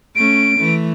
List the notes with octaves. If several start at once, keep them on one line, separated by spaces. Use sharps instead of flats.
A3 C#4 D7
E3 A3